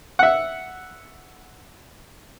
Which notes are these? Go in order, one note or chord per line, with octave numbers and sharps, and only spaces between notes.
E5 F#5